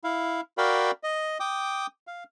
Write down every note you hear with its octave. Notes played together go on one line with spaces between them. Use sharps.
E4 F5
F#4 A#4 D5 F5 G5 B5
D#5
G5 D6 D#6
F5